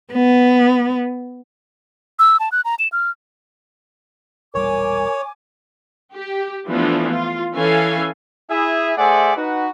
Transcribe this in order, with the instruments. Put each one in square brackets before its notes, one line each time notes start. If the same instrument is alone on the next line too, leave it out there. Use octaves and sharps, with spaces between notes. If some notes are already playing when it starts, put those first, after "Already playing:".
[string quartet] B3
[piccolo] E6
A5
F#6
A#5
E7
F6
[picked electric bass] E1 A#1 G3 [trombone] A#4 [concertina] C#5 [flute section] G#5 D6
[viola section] G4
E3 F3 A3 B3 D4
F4
E3 C#4 A4 F5 G#5
[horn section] E4 G#4 E5
A3 G#4 C5 D5 E5 F#5
D#4 F#4 B4